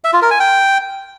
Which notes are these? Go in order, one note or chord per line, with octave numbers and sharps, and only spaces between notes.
E5
F4
A#4
G#5
G5